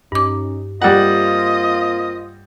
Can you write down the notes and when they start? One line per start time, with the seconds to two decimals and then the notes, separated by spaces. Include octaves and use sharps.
0.12 G2 C#4 D#4 D6
0.82 G3 A#3 C4 F4 D#5 F#5